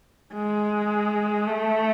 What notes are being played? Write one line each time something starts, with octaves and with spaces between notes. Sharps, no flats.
G#3
A3